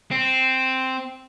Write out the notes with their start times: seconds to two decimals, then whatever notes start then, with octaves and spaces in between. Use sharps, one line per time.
0.11 C4